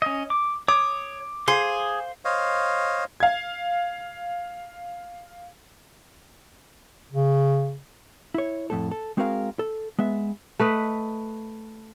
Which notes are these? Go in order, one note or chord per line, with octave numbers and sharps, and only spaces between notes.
C#4 D#5
D6
C#5 D6 D#6
G#4 C5 F5 C6
C5 C#5 D#5 F5
F5 G#6
C#3
E4 C#5
F2 A2 A4
A4
G#3 C4 F#4 G#4 A#4 F5
A4
G#3 B3 E5
A3 B4 D#5